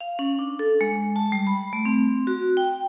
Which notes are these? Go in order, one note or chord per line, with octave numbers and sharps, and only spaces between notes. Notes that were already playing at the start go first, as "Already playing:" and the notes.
F5
C#4
D4
A4
G#3
A5
G3
B5
A3
C4
F#4
G5